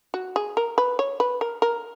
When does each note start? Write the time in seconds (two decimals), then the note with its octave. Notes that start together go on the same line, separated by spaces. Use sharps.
0.14 F#4
0.36 G#4
0.57 A#4
0.78 B4
0.99 C#5
1.20 B4
1.41 A#4
1.62 A#4